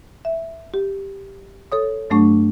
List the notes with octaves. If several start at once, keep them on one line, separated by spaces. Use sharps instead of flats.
E5
G4
A4 C#5 D#6
G2 F#3 A3 D4 C#6